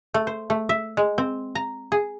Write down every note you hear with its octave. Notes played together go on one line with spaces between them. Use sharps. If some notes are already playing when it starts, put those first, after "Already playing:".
A3
C5
A3
E5
G#3
C4
A#5
G#4